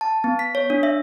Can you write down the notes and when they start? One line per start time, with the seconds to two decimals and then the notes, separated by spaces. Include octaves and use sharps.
0.01 A5
0.24 B3
0.39 B6
0.55 C#5
0.70 D4
0.83 E5